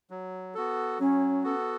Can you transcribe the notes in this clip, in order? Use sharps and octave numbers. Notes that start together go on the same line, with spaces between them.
F#3
B3 F#4 A4
F#3 C#4
B3 F#4 A4